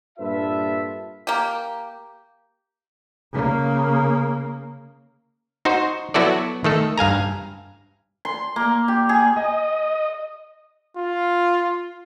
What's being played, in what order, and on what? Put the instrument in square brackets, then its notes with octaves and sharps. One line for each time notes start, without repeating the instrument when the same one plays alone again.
[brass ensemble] G2 A#2 F4 A4 B4 E5
[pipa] A#3 G4
[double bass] C#3 A#3
[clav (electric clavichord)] D#4 F#4 C5
F#3 B3 E4 F#4 A4 D5
D#3 A3 A4
G2 F5 G#5 A#5
[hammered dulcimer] C6
A#3
G4
G#4
[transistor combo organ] D#5
[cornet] F4